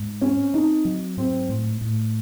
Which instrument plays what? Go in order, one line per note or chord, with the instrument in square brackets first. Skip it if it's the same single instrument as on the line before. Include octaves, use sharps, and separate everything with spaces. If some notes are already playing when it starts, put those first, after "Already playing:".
Already playing: [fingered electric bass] G#2
[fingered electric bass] C4 [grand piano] C#4
[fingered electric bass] C4 [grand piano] D#4
[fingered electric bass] F#3
[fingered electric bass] G#2 [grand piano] C4
[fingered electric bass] A2
A2